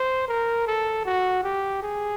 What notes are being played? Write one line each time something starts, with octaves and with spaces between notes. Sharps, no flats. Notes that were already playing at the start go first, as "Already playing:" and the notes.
Already playing: C5
A#4
A4
F#4
G4
G#4